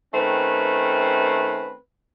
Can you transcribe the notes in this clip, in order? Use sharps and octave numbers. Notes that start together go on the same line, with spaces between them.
D#3 A3 C4 C#4 B4